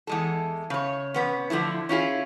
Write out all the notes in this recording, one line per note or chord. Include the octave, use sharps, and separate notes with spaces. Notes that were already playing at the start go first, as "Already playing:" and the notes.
E2 G#3 A4
C#3 C#5
C3 B3 C#4
D3 F3 A3 E4
C#4 E4 F4 G#4